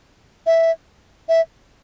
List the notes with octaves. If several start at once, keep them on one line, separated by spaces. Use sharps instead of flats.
E5
E5